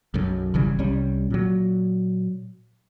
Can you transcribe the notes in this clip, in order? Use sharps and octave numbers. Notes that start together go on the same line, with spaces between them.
B1 F#2
G1 C#3 E3 G3
C2 G3 C#4
A#2 F#3